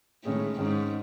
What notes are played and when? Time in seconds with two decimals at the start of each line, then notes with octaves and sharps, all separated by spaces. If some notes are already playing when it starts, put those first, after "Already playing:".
0.24 A2 D#3 G#3 C#4 G#4
0.58 G#2 D#3 G#3 C#4 G#4